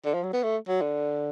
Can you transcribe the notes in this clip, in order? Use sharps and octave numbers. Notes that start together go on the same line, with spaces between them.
D3
F3
F#3
B3
A3
F#3
D3